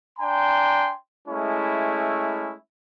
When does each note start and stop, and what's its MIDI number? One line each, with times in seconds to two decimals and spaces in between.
0.19 0.92 62
0.19 0.92 79
0.19 0.92 80
0.19 0.92 82
0.19 0.92 84
1.28 2.55 56
1.28 2.55 57
1.28 2.55 61
1.28 2.55 64